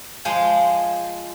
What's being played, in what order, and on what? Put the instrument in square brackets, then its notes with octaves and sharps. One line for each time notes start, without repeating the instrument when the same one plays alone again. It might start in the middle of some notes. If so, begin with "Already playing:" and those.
[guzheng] F3 G#3 F4 G#4 C5